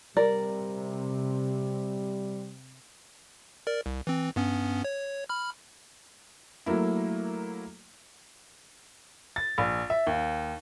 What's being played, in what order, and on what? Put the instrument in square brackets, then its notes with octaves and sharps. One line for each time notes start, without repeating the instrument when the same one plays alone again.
[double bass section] C3 [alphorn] G3 [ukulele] A#4 [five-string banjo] D5
[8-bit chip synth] A#4 D5
C2
E3 C4
G2 B3 C#4
C#5
B5 F6
[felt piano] F#3 A3 A#3 E4
[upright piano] A6
A#1
E5
D#2